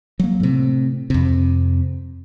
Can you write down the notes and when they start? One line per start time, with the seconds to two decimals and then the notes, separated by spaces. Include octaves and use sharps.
0.19 F#3 A#3
0.40 A2 C3
1.10 F2 C3